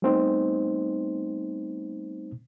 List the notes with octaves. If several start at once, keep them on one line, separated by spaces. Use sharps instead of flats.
G3 A3 B3 C4 D#4 C5